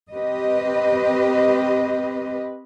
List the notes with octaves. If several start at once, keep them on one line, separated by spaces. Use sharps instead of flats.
C4 G4 B4 D#5